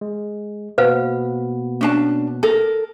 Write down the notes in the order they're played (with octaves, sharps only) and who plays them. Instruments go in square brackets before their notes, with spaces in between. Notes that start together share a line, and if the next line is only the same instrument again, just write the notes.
[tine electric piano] G#3
[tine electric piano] B2 A#3 B3 [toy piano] B4 C5 F5
[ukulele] C#4 D4 A5
A4 A#4